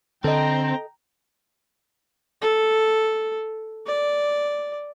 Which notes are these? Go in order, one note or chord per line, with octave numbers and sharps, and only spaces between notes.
D3 C4 A4 D#5 G5 A#5
A4
D5